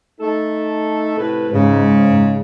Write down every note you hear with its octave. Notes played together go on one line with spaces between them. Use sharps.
A3 D#4 A4
A2 C3 B4
G#2 C#3